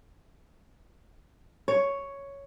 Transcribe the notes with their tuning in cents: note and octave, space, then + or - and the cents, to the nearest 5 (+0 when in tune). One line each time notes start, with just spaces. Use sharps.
C#5 +5